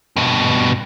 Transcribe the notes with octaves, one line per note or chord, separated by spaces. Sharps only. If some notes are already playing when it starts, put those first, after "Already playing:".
G2 B2